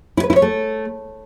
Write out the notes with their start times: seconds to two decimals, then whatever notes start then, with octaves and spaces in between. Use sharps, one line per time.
0.17 E4
0.24 B4
0.30 E4
0.36 C#5
0.42 A3